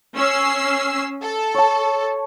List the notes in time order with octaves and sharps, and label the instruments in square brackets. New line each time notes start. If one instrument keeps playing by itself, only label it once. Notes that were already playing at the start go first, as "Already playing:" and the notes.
[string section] C#4 E6 C7
A4
[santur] C#5 A5